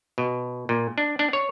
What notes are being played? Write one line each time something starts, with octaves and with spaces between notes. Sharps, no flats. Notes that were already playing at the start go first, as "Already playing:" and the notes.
B2
A#2
D4
D4
C#5